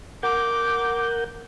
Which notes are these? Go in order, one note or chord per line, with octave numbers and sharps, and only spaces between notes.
A#4 F#5 D6 G6